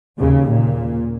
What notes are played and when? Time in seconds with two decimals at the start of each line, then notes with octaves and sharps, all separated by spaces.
0.20 D#2 C#3
0.52 A#2